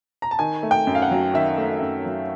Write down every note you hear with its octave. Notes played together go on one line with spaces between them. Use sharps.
A#5
A5
D#3 G#5
A3
G5
F#2
F5
F#5
F#3
D#3 E5
A3
F#2
F#3